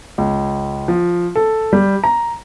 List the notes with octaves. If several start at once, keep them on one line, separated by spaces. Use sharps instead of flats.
C#2
F3
A4
G3
A#5